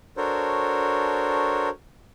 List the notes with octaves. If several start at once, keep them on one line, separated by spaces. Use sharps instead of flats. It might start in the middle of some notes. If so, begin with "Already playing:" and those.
D4 F#4 A4 A#4 C5 C#5